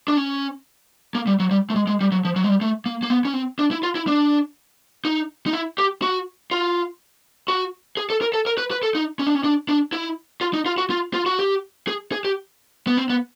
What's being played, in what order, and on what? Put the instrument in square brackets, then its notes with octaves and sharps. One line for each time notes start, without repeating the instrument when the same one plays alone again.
[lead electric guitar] D4
C#4
A#3
G3
F#3
G3
A3
G#3
G#3
G3
F#3
F3
F#3
G#3
G3
A3
A#3
A#3
B3
C#4
C4
D4
E4
F4
E4
D4
D#4
D#4
E4
G4
F#4
F4
F#4
G#4
A4
A#4
A4
A#4
B4
B4
A4
D#4
C#4
D4
C#4
D4
D4
E4
F4
D#4
F4
F#4
F4
F4
F#4
G4
G#4
G#4
G4
B3
C4
B3